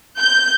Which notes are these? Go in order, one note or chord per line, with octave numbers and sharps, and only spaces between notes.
G6